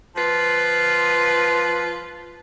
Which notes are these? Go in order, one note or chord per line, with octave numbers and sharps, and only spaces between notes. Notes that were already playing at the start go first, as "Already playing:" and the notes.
F3 F4 B4